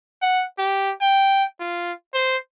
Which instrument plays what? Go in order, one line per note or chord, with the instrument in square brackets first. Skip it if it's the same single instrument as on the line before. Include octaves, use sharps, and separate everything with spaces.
[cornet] F#5
G4
G5
F4
C5